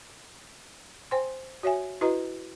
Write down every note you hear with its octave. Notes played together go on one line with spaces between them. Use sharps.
C5 G5 G#5 C6
F#4 C#5 E5 G#5
E4 F#4 B4 D#5 A#5